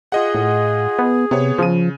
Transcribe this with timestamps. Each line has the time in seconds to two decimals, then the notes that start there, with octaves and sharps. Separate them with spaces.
0.12 F4 G#4 D#5 F#5
0.34 A2
0.99 B3
1.31 C3 B3 C#5
1.59 C#3 F3 D#7